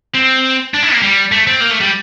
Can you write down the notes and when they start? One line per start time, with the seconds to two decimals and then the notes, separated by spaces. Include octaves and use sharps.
0.15 C4
0.74 D4
0.83 E4
0.92 A#3
1.02 G3
1.32 A3
1.47 C4
1.61 A#3
1.71 A3
1.81 G3